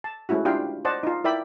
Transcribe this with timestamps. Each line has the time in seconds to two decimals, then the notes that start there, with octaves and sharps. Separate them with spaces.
0.04 A5
0.29 G#3 A3 C#4 E4 F#4
0.45 D4 E4 F4 G4 F5 G5
0.85 C5 D5 D#5 F#5 A5
1.03 D#4 F4
1.24 E4 A#4 D5 E5 G5 B5